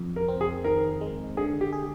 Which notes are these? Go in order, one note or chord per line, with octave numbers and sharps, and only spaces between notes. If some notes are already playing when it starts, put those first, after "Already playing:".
Already playing: F2
A#4
C4
G#4
D#3 A#4
G#3
D3 G#4
G4
G#4